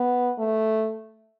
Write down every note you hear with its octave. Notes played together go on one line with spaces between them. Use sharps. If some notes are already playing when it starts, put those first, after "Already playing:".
Already playing: B3
A3